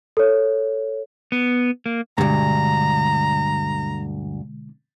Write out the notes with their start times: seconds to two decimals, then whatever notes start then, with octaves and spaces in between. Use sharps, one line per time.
0.17 A4 C#5
1.32 B3
1.86 A#3
2.18 D2 G2 B2 D3 G#3 A#5